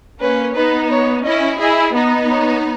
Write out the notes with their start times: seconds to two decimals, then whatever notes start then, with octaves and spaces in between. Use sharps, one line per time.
0.20 A#3 C#4 B4
0.55 B3 D#4 B4
0.90 C#5
1.25 C#4 E4 D#5
1.59 E4 G#4 D#5
1.95 B3 D#4 D#5
2.30 C#5